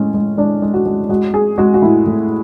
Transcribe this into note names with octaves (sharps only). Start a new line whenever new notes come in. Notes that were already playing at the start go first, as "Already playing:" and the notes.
Already playing: A2 G#3 C#4
G#3
G#3 D4
G#3
F#4
G#3
G#3 F#4
G#3 G#4
G#3 F#4
F#4
A2 E4
A2